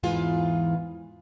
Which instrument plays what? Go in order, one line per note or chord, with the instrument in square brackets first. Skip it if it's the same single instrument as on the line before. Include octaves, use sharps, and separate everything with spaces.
[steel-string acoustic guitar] E2 G#2 E3 F4 G#4